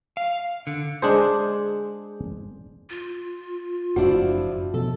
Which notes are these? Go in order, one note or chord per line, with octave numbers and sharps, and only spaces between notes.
F5
D3
G#3 D4 G#4 C5
F4
F#1 A2 F3 D4 E4 F#4
B2 F3 A4